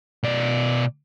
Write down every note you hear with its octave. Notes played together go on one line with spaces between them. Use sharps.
B2 D5